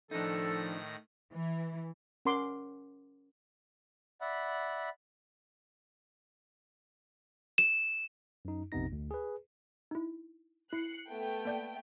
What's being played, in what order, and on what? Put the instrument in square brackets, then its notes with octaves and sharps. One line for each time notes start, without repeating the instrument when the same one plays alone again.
[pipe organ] A2 D#3 A#6 [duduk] F3 [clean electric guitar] D4 D#4 [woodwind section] A4
[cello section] E3
[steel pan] C#4 A#4 F#5 C6 D6
[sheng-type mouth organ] D5 E5 F#5 B5
[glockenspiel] E7
[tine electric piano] F#2 D#4
A#1 F2 C3 B3 D#4 A#6
D2
G#4 B4
[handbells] D#4 E4
[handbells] E4 [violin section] F#6 C7 C#7
[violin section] A3 B3 G5
[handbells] A#3 D5 G6